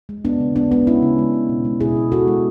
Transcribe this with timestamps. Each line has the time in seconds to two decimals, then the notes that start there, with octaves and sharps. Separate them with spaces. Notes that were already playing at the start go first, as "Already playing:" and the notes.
0.09 G#3
0.25 G#3 B3 D4
0.40 C#3
0.56 G#3 B3 D4
0.71 G#3 B3 D4
0.87 G#3 C#4 E4
1.02 C#3
1.18 G#3
1.34 G#3
1.49 B2
1.65 G#3
1.80 B2 E4 G#4
1.96 B2
2.12 G#3 F#4 A4
2.27 G#3